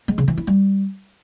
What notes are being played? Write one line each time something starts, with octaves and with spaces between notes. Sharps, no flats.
G#3
C#3
E3
E4
G3